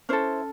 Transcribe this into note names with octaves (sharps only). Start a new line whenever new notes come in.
C#4 E4 A4 C5